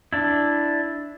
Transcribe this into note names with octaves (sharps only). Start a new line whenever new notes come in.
D4 E4